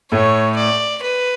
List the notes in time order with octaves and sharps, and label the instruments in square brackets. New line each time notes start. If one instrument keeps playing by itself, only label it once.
[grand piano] A2 A3 [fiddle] C#5
[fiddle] D5
B4